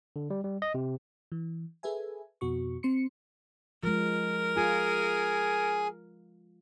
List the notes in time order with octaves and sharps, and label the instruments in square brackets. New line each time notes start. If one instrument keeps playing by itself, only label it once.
[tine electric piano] D3
G3
G3
D#5
C3
[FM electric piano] E3
G#4 A4 B4 E5 G#5
F2 B2 F#4 C#6
C4 C6 C#7
[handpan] F3 G#3 [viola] A#4
[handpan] F4 [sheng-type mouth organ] G#4 G#5